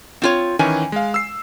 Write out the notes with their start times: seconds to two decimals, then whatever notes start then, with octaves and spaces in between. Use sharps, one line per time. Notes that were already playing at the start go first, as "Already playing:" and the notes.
0.22 C4 F4 C#5
0.59 D#3 E3 C#4 G#5
0.92 G#3 F5
1.14 E6 C7